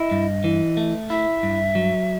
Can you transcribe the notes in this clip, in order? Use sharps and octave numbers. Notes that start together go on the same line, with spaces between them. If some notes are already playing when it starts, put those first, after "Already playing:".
Already playing: E4 D#5
G2
E3
A3
E4 E5
G2
F#3